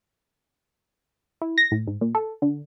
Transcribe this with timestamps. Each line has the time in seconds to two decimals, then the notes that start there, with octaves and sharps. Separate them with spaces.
1.42 E4
1.58 A#6
1.71 A2
1.87 G#2
2.01 A#2
2.15 A4
2.42 D3